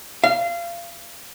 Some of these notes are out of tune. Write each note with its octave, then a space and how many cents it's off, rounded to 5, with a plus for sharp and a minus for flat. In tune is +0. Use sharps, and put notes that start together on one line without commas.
F5 -25